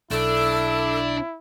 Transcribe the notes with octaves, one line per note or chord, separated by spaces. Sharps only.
B1 D4 E4 A4